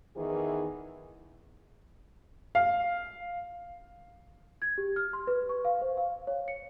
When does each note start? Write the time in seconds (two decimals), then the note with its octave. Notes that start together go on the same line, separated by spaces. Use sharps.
0.17 E2 D#3 E3 G#4
2.55 F5
4.62 G#6
4.78 G4
4.96 F6
5.13 C6
5.27 B4
5.49 C#6
5.65 F5
5.82 C5
5.97 F5
6.27 C#5
6.48 C#7